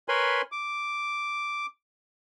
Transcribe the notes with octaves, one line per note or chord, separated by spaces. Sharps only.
A#4 B4 C#5 G#5 B5 C6
D6